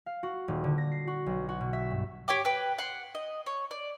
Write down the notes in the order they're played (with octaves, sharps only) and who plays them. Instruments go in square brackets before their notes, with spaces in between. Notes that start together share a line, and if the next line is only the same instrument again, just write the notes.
[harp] F5
F#4
D#1
D3
A#6
C7
F#4
B1
F#4
B2
E5
G2
[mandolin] G4 C#5 G5 D6
B4 G5
F#5 C6
D#5
C#5
D5